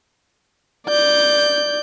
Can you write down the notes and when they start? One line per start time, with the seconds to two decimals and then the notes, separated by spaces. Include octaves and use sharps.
0.87 D5 G6